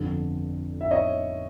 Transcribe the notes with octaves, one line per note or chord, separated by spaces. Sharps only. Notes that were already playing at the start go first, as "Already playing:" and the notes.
Already playing: G1 F2 D3
E5
C#5 D#5